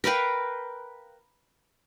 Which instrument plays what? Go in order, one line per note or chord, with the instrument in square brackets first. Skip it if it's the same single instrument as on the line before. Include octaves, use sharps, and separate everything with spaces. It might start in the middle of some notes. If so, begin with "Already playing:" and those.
[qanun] A#4 B4 F5 G5